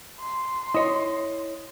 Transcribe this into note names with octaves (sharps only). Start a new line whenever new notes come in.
C6
E4 C#5 D#5